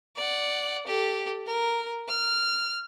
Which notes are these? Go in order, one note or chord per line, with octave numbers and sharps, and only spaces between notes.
D5 F#5
G4 A4
A#4
F6